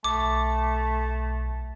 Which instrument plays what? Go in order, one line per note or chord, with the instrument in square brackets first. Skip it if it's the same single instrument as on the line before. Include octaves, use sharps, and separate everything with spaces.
[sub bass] B1 [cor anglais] A3 [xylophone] D6